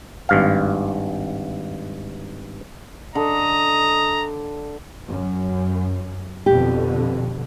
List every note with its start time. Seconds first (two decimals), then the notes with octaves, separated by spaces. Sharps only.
0.29 G#1 G2 F5
3.15 D3 D#5 A#5
5.09 F#2
6.46 F2 B2 D3 G4